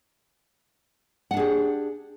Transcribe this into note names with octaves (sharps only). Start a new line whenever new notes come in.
D4 G4 G#4 F#5